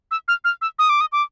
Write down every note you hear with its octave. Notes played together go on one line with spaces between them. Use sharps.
E6
F6
F6
E6
D#6
D6
D#6
D6